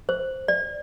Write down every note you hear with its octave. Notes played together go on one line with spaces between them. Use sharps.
C5
D5